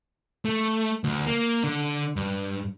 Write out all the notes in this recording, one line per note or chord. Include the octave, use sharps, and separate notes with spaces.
A3
D2
A#3
D3
G2